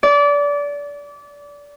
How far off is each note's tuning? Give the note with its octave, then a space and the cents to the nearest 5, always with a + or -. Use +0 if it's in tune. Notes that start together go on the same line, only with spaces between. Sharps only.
D5 -25